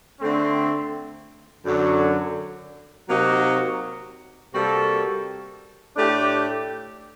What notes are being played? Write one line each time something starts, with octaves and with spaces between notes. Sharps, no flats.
D3 A3 C4
F#2 D3 F#3
C3 F#3 A#3 D#4 F#4
C3 G3 A#3 F#4 A4
A2 A3 D4 G4